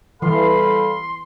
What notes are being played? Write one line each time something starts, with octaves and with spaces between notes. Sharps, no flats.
E3 G3 A4 F5 B5 C6